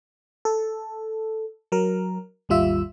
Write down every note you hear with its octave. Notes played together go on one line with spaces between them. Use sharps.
A4
F#3 A#4
G#1 D#2 G3 F4 E5 E6